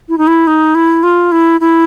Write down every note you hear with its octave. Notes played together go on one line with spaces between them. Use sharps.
E4
D#4
E4
D#4
E4
F4
E4
E4